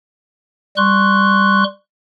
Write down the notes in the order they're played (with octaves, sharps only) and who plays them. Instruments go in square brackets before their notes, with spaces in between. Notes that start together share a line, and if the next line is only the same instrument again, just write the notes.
[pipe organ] G3 C6 C#6 F#6